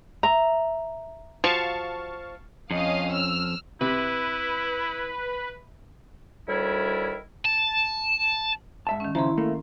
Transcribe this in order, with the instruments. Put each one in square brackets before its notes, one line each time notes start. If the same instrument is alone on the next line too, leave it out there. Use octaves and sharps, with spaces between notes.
[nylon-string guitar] E5 [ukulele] A#5
[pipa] F3 [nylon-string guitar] F#4 [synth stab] F5 A5 C#6
[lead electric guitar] F2 [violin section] C#4 D#5 F5
[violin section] E6 F6
[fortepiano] C3 [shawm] E4 [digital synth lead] B4
[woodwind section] D2 D#3 G3 E4 A#4 C#5
[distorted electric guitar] A5
[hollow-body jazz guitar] G#2 E5 A5
[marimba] D#3 C#4
[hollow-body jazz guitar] C#3 F3 [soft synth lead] E4 [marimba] A#5 C6
[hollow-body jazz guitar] A3 A#3